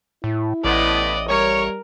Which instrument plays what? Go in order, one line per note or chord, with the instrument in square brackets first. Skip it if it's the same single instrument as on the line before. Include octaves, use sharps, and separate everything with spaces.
[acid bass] A2 [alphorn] E4
[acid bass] A1 [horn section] A2 B3 [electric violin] D5 D#5
[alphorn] G3 [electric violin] A#4 [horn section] C#5